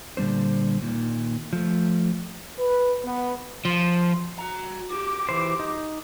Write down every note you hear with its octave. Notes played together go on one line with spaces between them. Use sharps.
A#2 D3 G3 C#4 C5
A#2 D#3
F3 A3
B4
B3
F3
F#4 A#5
F#4 G4 D6
E3 C5
D#4